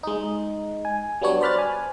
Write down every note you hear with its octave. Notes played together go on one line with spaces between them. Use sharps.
G#3 D#4
G#5
F#3 G3 B3 D4 C#5
C5 D5 B5 F6 F#6 A6
G#5